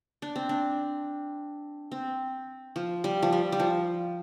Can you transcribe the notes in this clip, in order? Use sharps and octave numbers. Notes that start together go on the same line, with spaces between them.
D4
C4
D4
C4
F3
G3
F3
G3
G3
F3